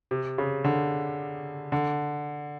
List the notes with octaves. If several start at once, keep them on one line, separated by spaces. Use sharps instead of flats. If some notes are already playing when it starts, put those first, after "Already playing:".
C3
C#3
D3
D3